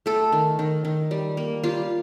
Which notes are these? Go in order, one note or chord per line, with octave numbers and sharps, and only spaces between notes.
A3 A4
D#3
D#3
D#3
G3
A#3
G3 F4